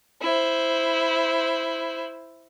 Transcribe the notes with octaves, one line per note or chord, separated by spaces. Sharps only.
E4 C5